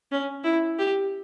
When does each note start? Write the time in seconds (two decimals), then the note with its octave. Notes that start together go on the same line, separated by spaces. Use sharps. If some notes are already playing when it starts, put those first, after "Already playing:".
0.12 C#4
0.44 E4
0.79 G4